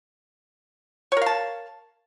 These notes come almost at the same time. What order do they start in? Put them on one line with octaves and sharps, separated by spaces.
C#5 A#4 F5 A5